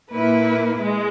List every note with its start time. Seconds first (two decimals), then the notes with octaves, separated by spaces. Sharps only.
0.13 A#2 A#3 E4 B4
0.80 G#3